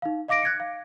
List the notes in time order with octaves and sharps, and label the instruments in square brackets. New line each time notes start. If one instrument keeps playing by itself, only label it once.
[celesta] D#4 F5
D#5 F5 D6 A#6 D7
F#6 G#6 A#6 C#7
F5